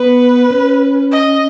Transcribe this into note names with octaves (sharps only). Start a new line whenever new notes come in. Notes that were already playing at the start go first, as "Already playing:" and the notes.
Already playing: B3 B4
C#4
D#5